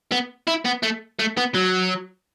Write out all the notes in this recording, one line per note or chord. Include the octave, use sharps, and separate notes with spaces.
B3
E4
B3
A3
A3
B3
F#3